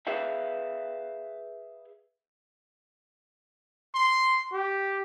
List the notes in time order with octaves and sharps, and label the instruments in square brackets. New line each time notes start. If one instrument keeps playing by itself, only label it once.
[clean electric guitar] G#4 B4 E5 F5 G5
[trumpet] C6
G4